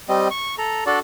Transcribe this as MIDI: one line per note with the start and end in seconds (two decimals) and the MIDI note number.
0.09 0.28 55
0.09 0.28 60
0.09 0.28 75
0.31 0.55 85
0.58 0.84 69
0.58 0.84 82
0.86 0.99 62
0.86 0.99 66
0.86 0.99 69
0.86 0.99 74